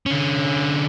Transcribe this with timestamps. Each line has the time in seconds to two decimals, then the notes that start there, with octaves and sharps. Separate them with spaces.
0.06 D3 C#4